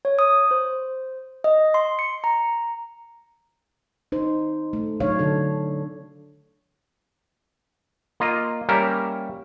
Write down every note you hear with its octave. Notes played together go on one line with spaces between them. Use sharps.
C#5
D#6
C5
D#5
C6
C#7
A#5
D#4 C5
A3
F#3 A3 D4 D#4 C#5 F5
D3 D4 A4
A#3 F4 D#5
G3 A#3 C#4 A#4 E5